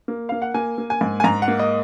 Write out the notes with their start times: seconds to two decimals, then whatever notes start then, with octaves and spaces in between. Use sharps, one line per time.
0.08 A#3
0.29 A#3 F5
0.42 F#5
0.54 A#3 G#5
0.78 A#3
0.90 G#5
1.01 G#2
1.20 G#5
1.24 G#2 A#5
1.42 F#5
1.48 A#3
1.59 D#5